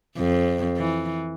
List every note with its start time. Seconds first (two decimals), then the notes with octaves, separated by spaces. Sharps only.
0.18 F2
0.77 E3